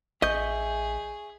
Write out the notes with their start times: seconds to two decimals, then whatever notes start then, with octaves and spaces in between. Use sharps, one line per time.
0.22 A1 G#4 D#5 E5 C#6 G6